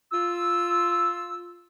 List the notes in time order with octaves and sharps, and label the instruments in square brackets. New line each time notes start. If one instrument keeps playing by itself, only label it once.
[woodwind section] F4 E6